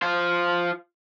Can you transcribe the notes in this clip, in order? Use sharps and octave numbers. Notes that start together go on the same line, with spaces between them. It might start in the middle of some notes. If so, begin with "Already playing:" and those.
F4 C5